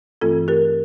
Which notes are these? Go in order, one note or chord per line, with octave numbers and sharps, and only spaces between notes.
G2 E3 A3 C4 F4 A4
G4 A#4